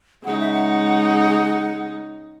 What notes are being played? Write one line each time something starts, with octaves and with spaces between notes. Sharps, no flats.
C#3 G#3 D#4 F#5
E5
F#5